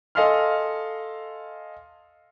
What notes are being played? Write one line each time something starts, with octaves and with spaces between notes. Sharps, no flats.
A4 D#5 F5 G#5 C6 F6